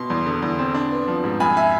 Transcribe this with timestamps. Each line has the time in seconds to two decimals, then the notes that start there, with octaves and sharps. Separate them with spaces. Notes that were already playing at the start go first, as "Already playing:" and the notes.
Already playing: B2 C6
0.10 E2
0.26 D3
0.42 E2
0.59 C4
0.74 D4
0.91 B3
1.08 F3
1.24 G#2
1.40 F2 G#5 B5
1.57 E5 G#5